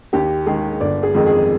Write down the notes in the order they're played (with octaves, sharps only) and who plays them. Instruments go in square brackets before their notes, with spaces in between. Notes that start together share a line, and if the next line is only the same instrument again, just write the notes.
[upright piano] D#2 G4
D#3 G#3 G#4
G1 D5
G#4
F2 D#3 G#3
G#4